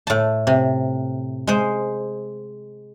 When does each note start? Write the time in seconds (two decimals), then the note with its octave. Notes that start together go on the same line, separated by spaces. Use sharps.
0.07 A2 A5
0.47 C3
1.47 G#3 C5